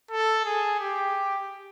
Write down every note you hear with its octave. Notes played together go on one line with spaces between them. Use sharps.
A4
G#4
G4